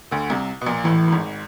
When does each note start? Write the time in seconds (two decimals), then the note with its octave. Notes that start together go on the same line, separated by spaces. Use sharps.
0.11 D2 D3
0.30 C2 C3
0.61 B2
0.66 A#1 A#2
0.84 A1 A2 E3
1.08 A2
1.12 G#1 G#2